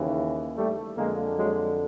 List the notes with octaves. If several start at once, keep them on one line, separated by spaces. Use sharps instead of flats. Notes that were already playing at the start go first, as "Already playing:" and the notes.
Already playing: D#2 C#3 E3
G3 A3
F2 D3 G#3 A#3
F#3 G#3